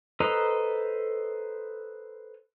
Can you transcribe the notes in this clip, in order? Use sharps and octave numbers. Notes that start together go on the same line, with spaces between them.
A4 B4 C5 D#5 A#5